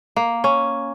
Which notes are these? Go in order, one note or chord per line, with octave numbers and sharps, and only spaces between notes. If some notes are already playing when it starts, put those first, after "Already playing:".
A#3
C#4